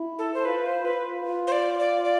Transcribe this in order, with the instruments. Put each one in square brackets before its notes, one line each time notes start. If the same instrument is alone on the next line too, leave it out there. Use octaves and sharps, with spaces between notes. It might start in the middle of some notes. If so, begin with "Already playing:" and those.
Already playing: [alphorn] E4
[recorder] A4
C5
[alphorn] F4 [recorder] B4
[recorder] C5
[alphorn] F4 [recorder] B4
[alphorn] F4
[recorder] C5
D5
D5
D5